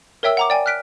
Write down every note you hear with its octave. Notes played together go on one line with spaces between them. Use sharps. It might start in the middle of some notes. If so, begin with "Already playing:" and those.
A#4 C#5 E5 G5 E6 G7
F#5 A#5 D6
D5 G5 G#5
F6 F#6 B6 D7